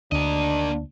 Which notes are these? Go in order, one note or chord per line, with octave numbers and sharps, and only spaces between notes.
D2 A#3 D4 D#5